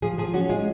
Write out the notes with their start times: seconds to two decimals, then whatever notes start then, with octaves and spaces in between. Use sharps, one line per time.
0.02 F3 G#4
0.18 F3 G#4
0.34 C#4 F#4
0.49 G#3 F4